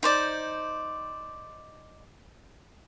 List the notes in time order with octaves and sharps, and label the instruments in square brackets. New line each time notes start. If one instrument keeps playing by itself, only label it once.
[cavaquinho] D#4 C5 D5